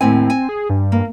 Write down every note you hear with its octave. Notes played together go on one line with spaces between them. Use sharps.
D#2 A2 C4 G#5
G#5
G#4
G2
A#3